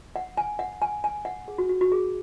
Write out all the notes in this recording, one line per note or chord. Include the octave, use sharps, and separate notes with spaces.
F#5
G#5
F#5
G#5
G#5
F#5
G#4
F#4
F#4
F#4
G#4